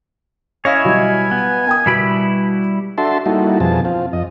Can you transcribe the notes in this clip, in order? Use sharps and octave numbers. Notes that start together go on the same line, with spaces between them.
C#4 E4 C#5 D#5 F5 G#5
B2 F#3 G3
B3
A#4 G5 D#6
B2 G3 E4 B5 B6 D7
D4 F#4 A4 E5 A5 C6
G3 A#3 D#4 E4 F#4 A4
F2 B2 F3 C4 G#4 A5
C4 F4
F2 D#5